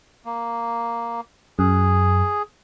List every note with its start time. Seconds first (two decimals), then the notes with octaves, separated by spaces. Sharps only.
0.25 A#3
1.59 F#2 G#4